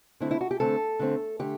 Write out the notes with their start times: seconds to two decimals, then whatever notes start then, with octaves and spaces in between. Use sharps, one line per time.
0.20 D3 A3 C4 E4
0.31 E4
0.41 F#4
0.51 G4
0.60 D3 A3 C4 A4
0.99 D3 A3 C4
1.39 D3 A3 G4